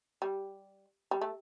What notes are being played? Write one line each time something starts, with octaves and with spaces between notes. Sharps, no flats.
G3
G3
A3